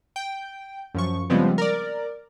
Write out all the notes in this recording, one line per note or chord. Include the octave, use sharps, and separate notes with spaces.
G5
F#2 F3 C#6
C#3 F3 G3 G#3 B3 C4
A#4 D5